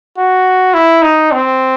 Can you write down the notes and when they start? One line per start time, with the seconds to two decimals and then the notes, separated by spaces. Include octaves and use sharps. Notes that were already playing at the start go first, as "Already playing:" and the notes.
0.18 F#4
0.74 E4
1.02 D#4
1.32 C4